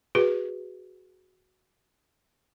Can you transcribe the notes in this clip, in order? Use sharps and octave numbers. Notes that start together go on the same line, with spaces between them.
F#4 G#4 B4